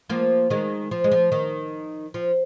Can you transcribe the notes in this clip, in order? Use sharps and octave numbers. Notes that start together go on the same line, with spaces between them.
F3 A#3
D#3 G#3
F3
G#3
F3
D#3
F3